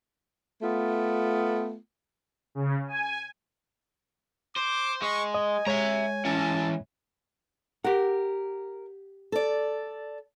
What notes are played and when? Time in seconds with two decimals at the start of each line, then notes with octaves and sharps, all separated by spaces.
0.62 A3 B3 F4
2.55 C#3
2.88 G#5
4.56 C5 D6
5.02 G#3 C#6
5.34 D#5 G#5
5.67 G#3 C#5 E5 A#5 G#6
6.25 E3 C#4 A5
7.84 G4 A#4 F#5
9.32 A4 D5